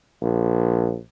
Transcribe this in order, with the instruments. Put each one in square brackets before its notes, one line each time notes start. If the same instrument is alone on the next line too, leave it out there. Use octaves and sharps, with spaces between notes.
[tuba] A#1